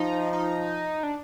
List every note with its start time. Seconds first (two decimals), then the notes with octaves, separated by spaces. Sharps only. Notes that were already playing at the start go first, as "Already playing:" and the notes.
Already playing: F3 D#4
0.33 D#4
1.03 D4